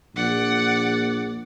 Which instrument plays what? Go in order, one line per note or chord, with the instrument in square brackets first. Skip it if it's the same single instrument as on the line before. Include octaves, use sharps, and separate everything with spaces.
[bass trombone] A#1 [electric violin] D5 F#5